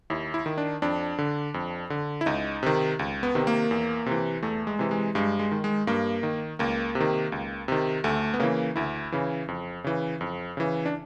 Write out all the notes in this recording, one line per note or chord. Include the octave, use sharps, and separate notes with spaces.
D#2 E4
E4
D#3
D4
F2 D4
D3
F2
D3
E4
C#2 D#4
C3 D#3
C#2
B3
C3 D#3
A#3
E2
C3 E3
E2 A3
G#3
C3 E3
G#3
G2 G#3
G#3
D#3
G#3
G2 A#3
D#3
C#2 A#3
C3
D#3
C#2
C3 D#3
D2 A3
B3
C#3 E3 A#3
D2 E4
C#3 E3
F2
C#3 E3
F2
C#3 E3
D4